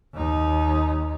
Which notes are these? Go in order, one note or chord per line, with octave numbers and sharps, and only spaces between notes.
D#2 D#4